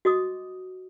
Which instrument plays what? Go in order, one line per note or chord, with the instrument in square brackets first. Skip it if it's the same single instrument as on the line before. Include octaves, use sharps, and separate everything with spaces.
[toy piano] F#4 D#5 D6 D#6